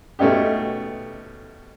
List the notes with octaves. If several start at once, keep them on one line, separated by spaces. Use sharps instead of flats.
B2 A3 C#4 D#4 G4